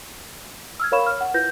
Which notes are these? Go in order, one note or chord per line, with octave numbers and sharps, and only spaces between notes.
E6 F6 G#6
A#4 C#5 F5 B5 C#6 E7
F6
F#5
E4 F4 B4 G6 A#6